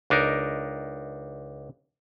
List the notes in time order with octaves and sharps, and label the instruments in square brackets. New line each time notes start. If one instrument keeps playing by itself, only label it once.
[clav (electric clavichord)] C#2 D4 D#4 A#4